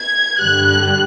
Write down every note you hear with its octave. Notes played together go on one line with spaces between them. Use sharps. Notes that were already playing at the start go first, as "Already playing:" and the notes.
Already playing: G#6
G2 D3 G3 F#6